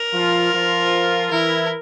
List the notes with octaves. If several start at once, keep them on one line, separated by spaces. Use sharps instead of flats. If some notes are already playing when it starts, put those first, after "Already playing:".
Already playing: A#4
F3 F4
F3 F4
E3 E4 A#4